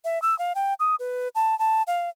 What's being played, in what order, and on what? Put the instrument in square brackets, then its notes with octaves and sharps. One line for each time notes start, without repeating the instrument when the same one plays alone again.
[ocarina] E5
E6
F5
G5
D#6
B4
A5
A5
F5